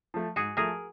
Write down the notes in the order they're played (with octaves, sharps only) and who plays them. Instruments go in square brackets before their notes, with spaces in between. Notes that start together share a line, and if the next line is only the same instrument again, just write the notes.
[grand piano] F3 A3
[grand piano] G#2 [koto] F#4 G#4
[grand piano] F3 A3 [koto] G#4 A#4